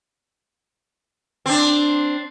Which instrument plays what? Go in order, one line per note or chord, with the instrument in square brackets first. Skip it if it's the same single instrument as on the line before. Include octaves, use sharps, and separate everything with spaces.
[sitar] C4 D4